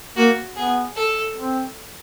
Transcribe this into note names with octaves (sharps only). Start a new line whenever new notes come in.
A#3 F#4
B3 G#4
A4
C4